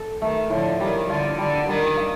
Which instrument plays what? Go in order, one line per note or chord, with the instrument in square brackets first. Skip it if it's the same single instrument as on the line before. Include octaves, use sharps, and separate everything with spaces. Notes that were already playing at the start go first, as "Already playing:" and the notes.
Already playing: [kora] A4
[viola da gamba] D#3 [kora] A3
[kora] A2 [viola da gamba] D3 F3
[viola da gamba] D#3 [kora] G3
[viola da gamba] D3 [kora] F4
[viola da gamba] D3 [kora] G3
[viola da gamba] D#3 [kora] G3
[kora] A#3